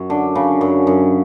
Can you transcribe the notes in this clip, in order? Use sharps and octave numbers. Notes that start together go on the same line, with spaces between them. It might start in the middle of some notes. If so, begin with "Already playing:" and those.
Already playing: F#2
D3
C#3
F#2
F#2